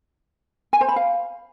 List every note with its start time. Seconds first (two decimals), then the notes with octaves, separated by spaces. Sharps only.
0.73 G#5
0.81 C5
0.89 B5
0.96 F5